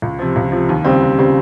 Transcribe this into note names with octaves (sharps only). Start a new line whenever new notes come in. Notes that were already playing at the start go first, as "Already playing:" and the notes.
C#2
C3 F3
C#2
C3 F3
D#2
C#3 G3 C4
D#2
C#3 G3 C4